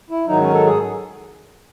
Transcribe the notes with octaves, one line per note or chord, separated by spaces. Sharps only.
E4
G#2 D#3 F#3 D#4
C#4
A4
G#4